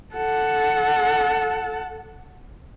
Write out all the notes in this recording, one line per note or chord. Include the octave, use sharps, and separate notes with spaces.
A4 F#5